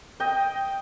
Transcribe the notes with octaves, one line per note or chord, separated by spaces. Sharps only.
D#5 G5